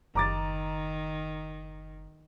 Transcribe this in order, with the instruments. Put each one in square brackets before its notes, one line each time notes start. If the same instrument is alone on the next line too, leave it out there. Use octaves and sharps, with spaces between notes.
[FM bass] F#1 [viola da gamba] D#3 [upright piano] A#5 D6 A6